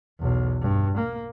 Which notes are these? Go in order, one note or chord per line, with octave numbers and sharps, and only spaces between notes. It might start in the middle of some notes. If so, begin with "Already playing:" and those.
B1 E2
G2
A#3